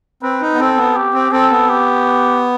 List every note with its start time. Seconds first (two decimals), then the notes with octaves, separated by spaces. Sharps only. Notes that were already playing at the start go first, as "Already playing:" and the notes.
0.23 C4 B4
0.41 D#4
0.54 B3
0.60 C4 A4
0.77 B3
0.96 G4
1.14 C4
1.32 C4 A4
1.51 B3
1.69 G4